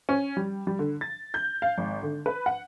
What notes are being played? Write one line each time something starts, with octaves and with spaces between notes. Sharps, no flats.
C#4
G3
G3
D3
A6
G6
F5
G#1
D3
B4
F#5